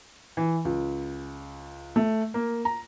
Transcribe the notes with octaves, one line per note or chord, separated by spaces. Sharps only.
E3
C#2
A3
A#3
A#5